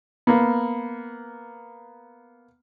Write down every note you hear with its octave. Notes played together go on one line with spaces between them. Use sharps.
A#3 B3